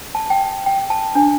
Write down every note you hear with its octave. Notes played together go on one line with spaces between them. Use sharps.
A5
G5
G5
A5
D4